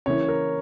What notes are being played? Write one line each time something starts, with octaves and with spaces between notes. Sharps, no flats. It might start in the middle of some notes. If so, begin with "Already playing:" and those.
C#3 E3 A#3 E4 C#5
A#4